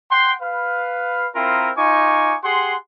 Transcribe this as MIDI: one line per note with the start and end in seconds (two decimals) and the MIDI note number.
0.11 0.33 78
0.11 0.33 79
0.11 0.33 84
0.42 1.27 71
0.42 1.27 77
1.35 1.70 60
1.35 1.70 64
1.35 1.70 65
1.35 1.70 70
1.77 2.36 63
1.77 2.36 65
1.77 2.36 80
1.77 2.36 85
1.77 2.36 86
2.43 2.75 67
2.43 2.75 68
2.43 2.75 78
2.43 2.75 84